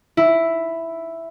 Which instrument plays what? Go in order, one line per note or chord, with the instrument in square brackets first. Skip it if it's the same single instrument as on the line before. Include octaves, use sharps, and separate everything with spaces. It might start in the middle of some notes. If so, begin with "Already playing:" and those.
[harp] E4